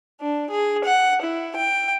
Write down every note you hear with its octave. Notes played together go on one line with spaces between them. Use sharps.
D4
G#4
F#5
E4
G5